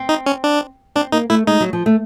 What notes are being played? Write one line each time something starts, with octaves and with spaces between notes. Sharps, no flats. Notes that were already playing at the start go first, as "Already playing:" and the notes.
Already playing: C4
D#4
C#4
D4
C4 D4
A#3 D#4
A3 E4
G#3 D#4
F#3
F3
A3